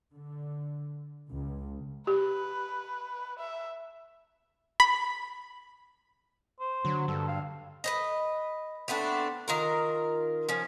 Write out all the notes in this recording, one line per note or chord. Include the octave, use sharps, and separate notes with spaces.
D3
C#2
G4 B4
E5
B5
C5
D3 F#3
G2 A4
F5
B4 C5 D#5
A3 B3 C4 D4
D#3 F4 A#4
F3 C#4